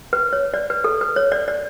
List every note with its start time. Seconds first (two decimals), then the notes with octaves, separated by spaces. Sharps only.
0.13 B4
0.33 C#5
0.54 D5
0.70 B4
0.84 A4
1.01 B4
1.16 C#5
1.32 D5
1.48 D5